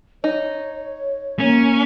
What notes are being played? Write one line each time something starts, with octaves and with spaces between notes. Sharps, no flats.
D#4 C#5
A#3 C#4